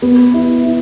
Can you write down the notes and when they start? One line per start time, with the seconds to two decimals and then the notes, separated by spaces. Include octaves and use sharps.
0.02 B3
0.34 E4
0.65 E4